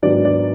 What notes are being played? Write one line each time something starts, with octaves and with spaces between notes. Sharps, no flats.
G#2 D#3 F#3 B3 D4 D5
D5